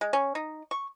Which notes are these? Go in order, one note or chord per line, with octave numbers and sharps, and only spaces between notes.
G#3
C#4
D#4
C#6